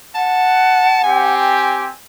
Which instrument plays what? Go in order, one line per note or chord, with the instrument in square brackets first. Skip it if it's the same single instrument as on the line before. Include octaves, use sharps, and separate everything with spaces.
[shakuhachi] F#5 [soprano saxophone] A5
[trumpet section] C4 G4 [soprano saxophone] G#5